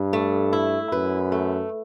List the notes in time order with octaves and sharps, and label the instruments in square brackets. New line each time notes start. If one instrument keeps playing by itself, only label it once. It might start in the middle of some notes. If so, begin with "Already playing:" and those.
Already playing: [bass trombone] G2
[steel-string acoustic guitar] A3
E4
[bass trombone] F#2 [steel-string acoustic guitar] B4
[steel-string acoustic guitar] A3